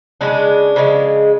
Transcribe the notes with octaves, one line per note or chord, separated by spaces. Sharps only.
C#3 F3 G#3 D4
C#3 F3 G#3